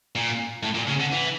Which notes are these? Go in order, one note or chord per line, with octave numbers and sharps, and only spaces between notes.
A#2
A2
A#2
C#3
D3
E3